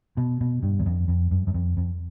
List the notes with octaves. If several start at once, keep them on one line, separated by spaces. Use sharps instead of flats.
B2
B2
G2
E2
F2
F2
F#2
F#2
F2
F2